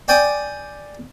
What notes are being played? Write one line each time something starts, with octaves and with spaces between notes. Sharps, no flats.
D5 G5 G#5 D6 D#6